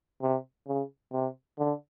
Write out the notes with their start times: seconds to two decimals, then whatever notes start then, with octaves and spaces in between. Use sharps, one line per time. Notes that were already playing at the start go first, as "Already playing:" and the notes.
0.22 C3
0.68 C#3
1.13 C3
1.58 D3